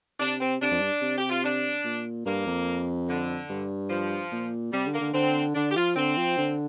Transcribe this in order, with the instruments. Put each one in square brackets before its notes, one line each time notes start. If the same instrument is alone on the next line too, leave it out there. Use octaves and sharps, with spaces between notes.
[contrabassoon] C3 [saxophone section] D4
[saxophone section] C4
[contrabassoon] C3 [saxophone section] D4
[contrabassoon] F2
G2
C3
[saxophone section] G4
F4
D4
[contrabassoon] A#2
[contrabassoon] G2 [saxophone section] A#3
[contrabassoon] F2
[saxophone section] D3
[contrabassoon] G2
[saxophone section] F3
[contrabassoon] A#2
[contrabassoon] C3 [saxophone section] G3
[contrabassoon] D3
[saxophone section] A#3
[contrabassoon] D3
[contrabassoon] D3 [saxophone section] C4
[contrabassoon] D3 [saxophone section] D4
[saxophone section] G4
[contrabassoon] F3 [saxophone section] F4
[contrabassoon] D3 [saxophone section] C4
[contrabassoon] F3
D3